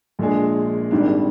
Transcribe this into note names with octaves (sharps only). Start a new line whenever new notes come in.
A#1 A#2 G#3 D4 G#4
G#1 G#2 D#3 G3 D4